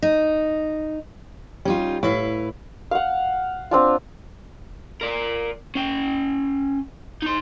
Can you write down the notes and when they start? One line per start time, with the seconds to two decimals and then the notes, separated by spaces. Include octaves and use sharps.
0.02 D#4
1.65 G3 C#4 D#4 F4
2.03 A2 E4 B4 F5
2.91 F5 F#5
3.71 C4 D4 F4
5.01 A#4 D5
5.75 C#4 G5
7.22 D#4 C6